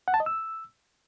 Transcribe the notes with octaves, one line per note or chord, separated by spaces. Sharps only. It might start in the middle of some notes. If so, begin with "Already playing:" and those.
F#5
A5
D#5
E6